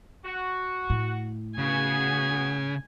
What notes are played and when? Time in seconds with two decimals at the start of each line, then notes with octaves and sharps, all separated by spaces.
0.25 F#4
0.90 A2
1.58 C#3 B3 F#4 G#4 G#5